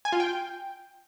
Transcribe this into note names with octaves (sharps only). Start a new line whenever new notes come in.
G#5
F4
G5